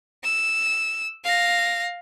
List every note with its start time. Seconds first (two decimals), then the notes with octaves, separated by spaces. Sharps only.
0.24 E6
1.25 F5 A#6